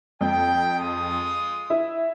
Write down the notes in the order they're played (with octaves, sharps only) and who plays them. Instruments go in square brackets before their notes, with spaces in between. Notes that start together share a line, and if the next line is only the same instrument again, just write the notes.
[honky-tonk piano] F2 [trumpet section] G5
[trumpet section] G#3 F4 D#6
[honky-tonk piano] E4 E5